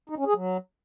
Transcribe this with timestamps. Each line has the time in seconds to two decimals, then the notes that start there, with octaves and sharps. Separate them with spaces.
0.09 D#4
0.18 C#4
0.26 G#4
0.35 F#3